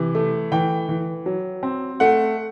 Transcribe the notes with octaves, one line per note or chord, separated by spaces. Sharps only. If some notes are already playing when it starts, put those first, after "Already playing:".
Already playing: C3 E3
A3
E3 G5
E3
F#3
C4
A3 F#5